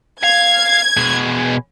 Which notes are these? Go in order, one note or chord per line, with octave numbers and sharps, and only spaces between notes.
F5 G#6
B2 G#4